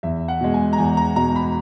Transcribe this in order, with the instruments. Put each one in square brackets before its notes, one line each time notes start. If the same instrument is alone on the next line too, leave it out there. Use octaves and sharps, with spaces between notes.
[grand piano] E2 E5
F#5
B2 G#3
G#5
A#5
E2 G#5
A#5
B2 G#3 A#5
B5